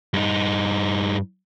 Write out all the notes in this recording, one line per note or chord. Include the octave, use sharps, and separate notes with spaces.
G2 D#4